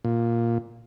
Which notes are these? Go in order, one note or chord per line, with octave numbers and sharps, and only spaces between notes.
A#2